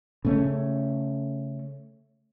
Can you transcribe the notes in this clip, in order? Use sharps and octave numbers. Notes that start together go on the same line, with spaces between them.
C#3 A3 C#4